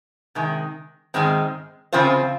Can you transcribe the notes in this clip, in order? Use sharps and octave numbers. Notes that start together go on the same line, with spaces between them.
C3 D#3 G#3
G#2 D#3 G#3 C4
C#3 F3 C4 F4 C5